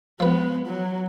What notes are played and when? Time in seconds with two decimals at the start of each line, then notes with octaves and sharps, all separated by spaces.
0.20 F3 G#3 B3 B4
0.66 F#3